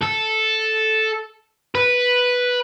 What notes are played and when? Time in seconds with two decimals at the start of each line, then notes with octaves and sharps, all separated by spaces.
0.01 A4
1.75 B4